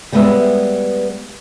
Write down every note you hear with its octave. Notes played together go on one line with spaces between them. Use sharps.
G3 G#3 B3 B4 C#5 E5